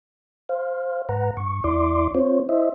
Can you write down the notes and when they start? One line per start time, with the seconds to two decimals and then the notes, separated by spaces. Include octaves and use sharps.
0.49 C5 F5
1.09 G#2 B4 F#5 A#5
1.37 G2 C#6
1.64 E2 E4 D5 C6 D6
2.15 C4 F4 C5 C#5
2.49 E4 C5 D#5 E5